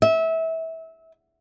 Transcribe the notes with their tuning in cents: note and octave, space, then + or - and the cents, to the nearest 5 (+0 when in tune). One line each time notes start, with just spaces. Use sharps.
E5 -25